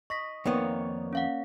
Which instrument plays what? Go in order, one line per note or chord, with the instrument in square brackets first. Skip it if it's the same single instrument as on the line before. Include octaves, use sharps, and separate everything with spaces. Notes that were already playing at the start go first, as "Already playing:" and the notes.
[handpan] D#5 [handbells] C#6 A#6 B6
[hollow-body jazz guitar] F2 D#3 B3 [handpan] A#3 C#5 D5
[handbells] C#4 F5 F#5